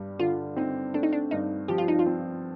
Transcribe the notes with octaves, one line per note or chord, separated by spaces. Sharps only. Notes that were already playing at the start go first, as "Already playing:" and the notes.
Already playing: G2 G3
D3 F4
C4 D#4
A3 D4
D#4
D4
G2 D#4
F3 G4
F4
D#4
F4
C4